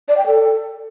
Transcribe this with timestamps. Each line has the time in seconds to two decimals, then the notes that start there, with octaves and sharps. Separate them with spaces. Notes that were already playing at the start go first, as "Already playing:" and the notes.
0.09 D5
0.17 G5
0.26 A4